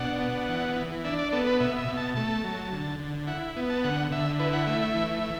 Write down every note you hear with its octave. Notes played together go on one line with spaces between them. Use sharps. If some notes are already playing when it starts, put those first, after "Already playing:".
Already playing: B2 D4 F#5
B3
E3
E3
D4 E5
D5
B3 A4
B4
B2 E5
E5
B2
A5
A3 A5
F#3
D3
D3
E4 F#5
B3
A5
D3 F#5
D3 E5
E4 B4
F#5
A3 E5
E5
E3
E3